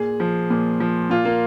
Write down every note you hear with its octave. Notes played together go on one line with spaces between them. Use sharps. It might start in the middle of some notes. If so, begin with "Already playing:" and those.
Already playing: A#2 G#4
F3
A#2
F3
A#2 F4
A#3